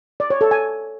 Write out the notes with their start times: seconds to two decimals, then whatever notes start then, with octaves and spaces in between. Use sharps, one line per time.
0.20 D5
0.30 C#5
0.41 A4
0.51 G#5